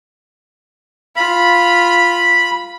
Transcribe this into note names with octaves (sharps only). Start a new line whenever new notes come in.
F4 B5